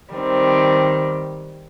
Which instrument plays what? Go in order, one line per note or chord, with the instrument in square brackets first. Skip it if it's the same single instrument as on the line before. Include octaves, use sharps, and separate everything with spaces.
[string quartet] D#3 G3 C4